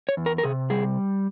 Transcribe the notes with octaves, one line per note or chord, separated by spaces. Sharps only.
C#5
E2
A#4
A#4
C3 G#4
G3 G#4